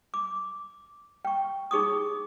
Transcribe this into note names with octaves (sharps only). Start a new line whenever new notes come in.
D6
G5 C#6
D#4 G#4 C#6 D#6